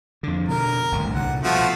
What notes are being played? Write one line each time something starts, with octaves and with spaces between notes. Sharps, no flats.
F2 D3
B2 D3 A#4
G#1 D2 G2
C2 A#2 D3 F#5
B2 F3 A3 F#4